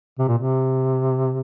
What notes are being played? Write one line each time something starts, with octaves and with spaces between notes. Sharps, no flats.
C3
A#2
C3